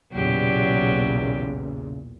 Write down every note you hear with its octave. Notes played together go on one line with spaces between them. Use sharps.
B1 E2 A#2 C#3 F#3 G4 D5